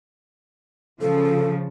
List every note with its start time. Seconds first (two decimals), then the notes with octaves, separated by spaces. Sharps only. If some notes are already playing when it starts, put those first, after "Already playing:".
1.01 C#3 F3 A4